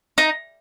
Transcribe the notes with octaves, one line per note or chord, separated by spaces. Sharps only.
D#4